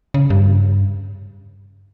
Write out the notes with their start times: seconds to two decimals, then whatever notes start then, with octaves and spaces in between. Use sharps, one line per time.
0.14 C#3
0.30 G2